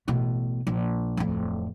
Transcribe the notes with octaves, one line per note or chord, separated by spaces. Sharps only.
A1 B2
A#1
D1 F2